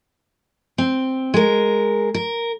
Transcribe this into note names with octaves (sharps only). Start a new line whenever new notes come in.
C4
G#3 A#4
A#4